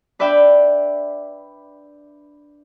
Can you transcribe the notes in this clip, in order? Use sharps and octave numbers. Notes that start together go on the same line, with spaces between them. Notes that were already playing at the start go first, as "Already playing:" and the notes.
D4 B4 D5 E5 G5